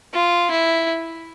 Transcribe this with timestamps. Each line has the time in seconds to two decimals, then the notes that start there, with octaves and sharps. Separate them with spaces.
0.14 F4
0.50 E4